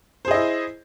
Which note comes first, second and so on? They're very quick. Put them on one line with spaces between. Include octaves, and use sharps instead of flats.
C5 G#4 D#5 E4